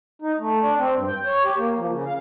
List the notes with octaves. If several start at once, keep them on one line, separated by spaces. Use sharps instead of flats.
D#4
A3
D4
C4
G2
G5
C#5
G4
A#3
F3
C#3
F5